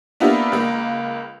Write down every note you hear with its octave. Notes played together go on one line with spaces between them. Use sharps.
A#3 B3 D4 E4 F4 G4
C#2 A#3